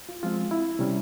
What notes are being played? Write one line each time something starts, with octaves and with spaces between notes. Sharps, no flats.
F4
F3 G#3 C4 F4
E4
C3 G3 C#4